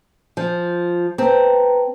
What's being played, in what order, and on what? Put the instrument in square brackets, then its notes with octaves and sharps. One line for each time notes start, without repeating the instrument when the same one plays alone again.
[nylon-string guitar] F3
[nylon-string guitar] C4 [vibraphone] B4 A5 A#5